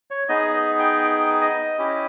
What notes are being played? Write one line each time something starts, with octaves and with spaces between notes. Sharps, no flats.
C#5
B3 D#4 G#4 D#5
D#5
G5
G5
D#5
C#4 E4 G4